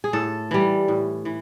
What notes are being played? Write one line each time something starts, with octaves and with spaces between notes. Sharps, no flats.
G#4
A2 A4
E3 G3
A2
E3